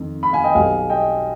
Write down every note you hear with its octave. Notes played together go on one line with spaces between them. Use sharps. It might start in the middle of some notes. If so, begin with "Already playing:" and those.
Already playing: F2 D#3
B5
F5 G#5
D#5 G5
B1 B2 G3 F5 G#5
D#5 G5